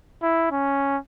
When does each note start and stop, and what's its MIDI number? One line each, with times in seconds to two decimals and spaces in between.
0.23 0.51 64
0.51 0.97 61